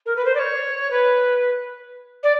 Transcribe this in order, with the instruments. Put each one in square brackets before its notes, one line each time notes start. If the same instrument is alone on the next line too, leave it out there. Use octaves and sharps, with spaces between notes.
[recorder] A#4
B4
C5
D5
C#5
B4
D5